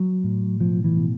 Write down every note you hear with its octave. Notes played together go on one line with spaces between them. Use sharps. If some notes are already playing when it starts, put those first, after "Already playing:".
Already playing: F#3
A2
B2 F3
E3
B2